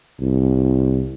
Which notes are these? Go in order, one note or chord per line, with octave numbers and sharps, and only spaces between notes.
C2